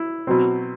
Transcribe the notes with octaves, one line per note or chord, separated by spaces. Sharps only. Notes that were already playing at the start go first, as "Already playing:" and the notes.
Already playing: E4
B2 F#3 C4